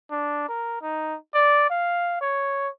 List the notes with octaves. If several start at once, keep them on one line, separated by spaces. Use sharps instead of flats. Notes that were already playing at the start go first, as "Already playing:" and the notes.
D4
A#4
D#4
D5
F5
C#5